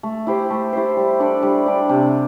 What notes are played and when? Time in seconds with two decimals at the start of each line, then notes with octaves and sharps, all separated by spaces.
0.03 A3
0.27 E4 G4 C5
0.50 A3
0.73 E4 G4 C5
0.97 G3
1.20 D4 A4 D5
1.43 G3
1.66 D4 A4 D5
1.89 C3